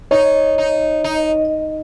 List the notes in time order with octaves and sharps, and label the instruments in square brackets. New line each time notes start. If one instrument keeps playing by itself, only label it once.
[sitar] D#4 [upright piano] C#5
[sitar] D#4
D#4